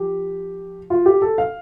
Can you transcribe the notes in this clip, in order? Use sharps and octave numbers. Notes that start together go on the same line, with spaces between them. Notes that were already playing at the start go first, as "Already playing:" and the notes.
Already playing: F3 G4
F4
G4
A4
F5